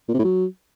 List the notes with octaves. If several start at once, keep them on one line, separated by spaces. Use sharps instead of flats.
A#2
C3
A2
F#3